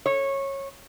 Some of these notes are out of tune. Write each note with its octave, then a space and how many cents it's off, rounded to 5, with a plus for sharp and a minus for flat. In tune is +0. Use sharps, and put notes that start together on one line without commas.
C#5 -15